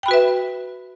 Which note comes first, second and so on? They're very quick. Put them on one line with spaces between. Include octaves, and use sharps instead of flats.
G5 B5 F#4 B4 E5